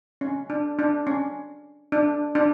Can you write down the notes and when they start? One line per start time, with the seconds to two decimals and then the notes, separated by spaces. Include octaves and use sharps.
0.21 C#4
0.50 D4
0.79 D4
1.07 C#4
1.92 D4
2.35 D4